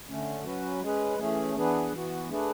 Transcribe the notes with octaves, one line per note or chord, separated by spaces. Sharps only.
D3 A3 C#4
F#3 C#4 F#4 B4
G#3 C#4 G#4 B4
E3 A3 C#4 G#4
E3 B3 D4 G#4 B4
E3 B3 F#4
A3 D4 G#4 B4